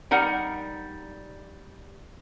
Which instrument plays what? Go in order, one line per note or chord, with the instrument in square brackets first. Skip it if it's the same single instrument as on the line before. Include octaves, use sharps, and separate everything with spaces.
[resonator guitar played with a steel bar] G3 D#4 A#4 F#5